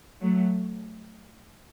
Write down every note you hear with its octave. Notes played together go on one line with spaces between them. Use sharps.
F#3 A3